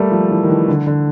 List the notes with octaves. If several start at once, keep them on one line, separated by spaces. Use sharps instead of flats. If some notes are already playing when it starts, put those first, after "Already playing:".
Already playing: G3 A3 A#3
F3
E3
D#3
E3
D3
D3